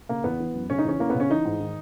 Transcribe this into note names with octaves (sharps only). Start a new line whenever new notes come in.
C#3 A#3
E2 B3
E3
F#2
C#3 C#4
D#4
E2 C#4
E3 A#3
C#3 B3
C#4
E3 D#4
G#2
D#3